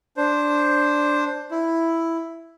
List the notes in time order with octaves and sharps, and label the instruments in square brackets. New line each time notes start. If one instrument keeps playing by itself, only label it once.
[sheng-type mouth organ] D4 C5
E4